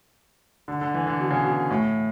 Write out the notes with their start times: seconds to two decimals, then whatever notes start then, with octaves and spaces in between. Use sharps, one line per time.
0.68 D3
0.81 D3
0.94 E3
1.07 D3
1.20 B2
1.30 C#3
1.44 B2
1.70 A2